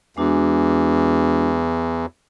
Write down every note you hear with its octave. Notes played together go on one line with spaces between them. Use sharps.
E2 G#3 D4 F#4